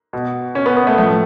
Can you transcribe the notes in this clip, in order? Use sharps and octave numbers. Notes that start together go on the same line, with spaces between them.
B2
C#4
B3
B3
A3
A2 F3 A3